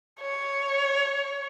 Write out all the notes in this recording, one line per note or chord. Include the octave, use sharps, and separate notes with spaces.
C#5